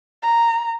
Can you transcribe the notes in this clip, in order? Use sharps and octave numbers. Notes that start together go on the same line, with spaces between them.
A#5